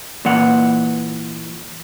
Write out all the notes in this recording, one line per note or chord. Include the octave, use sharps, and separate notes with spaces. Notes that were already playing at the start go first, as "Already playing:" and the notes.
A#2 E3 F#5